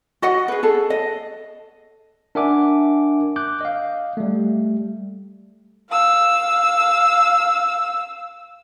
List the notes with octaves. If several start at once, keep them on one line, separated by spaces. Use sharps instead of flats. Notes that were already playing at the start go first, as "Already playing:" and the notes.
F#4 D#5 F#5
G#4 B4
G#4 A4
D#5
D4 A#4 E5 F#5 G#5 D6
D6 F#6 G6
D#5 F5
G3 A3
F5 E6